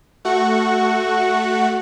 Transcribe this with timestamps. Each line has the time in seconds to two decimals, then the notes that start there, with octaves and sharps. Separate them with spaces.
0.25 A3 F#4 F#5 C#6